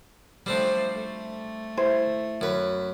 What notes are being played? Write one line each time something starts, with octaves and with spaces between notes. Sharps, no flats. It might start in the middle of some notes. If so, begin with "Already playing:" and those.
F3 G3 A3 C4 D4 C5
A3
E4 C5
F#2 B4